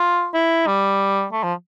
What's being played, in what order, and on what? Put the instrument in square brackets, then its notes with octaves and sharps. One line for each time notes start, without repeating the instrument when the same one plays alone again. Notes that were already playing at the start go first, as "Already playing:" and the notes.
Already playing: [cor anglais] F4
E4
G3
A3
F3